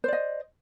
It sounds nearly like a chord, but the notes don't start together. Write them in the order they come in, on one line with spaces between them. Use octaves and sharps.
C5 D5 D#5